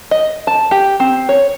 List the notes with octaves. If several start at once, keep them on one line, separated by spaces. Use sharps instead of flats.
D#5
A5
G4
C4
C#5